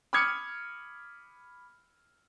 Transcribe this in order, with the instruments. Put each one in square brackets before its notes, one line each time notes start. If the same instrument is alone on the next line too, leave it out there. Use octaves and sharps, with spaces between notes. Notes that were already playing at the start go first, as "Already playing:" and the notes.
[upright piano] B5 D6 D#6 F6 G#6 C#7